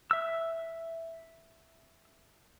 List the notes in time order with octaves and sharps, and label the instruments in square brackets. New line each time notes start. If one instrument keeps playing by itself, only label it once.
[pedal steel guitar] E5 E6